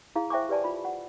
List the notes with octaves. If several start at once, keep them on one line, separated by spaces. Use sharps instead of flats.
E4 G#4 F5
C5 E5 G5 G#5 C#6 D6
G4 B4 D5 G#5 A5
F4 B5
F#5